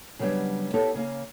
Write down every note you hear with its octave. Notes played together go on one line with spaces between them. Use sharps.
C#3 F#3 G3 B3 D4
B3 E4 G4 A4 C#5 E5
C#3 A#3 G#4